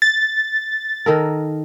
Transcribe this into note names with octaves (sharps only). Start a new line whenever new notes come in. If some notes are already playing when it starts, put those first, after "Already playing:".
A6
D#3 A4 A#4